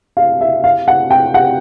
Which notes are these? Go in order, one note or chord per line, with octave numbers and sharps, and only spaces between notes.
F5
E5
F5
F#5
G5
F#5